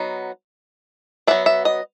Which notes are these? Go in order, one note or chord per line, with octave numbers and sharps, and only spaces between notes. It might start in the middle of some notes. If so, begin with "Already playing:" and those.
Already playing: F#3 B3 D#4
F#3 B3 D4 E5
E5
D#5